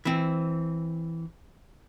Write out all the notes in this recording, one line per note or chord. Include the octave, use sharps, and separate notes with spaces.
E3 C4